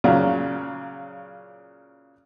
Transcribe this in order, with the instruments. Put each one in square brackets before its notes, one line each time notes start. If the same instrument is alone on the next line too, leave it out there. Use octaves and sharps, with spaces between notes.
[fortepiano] A#2 C#3 F#3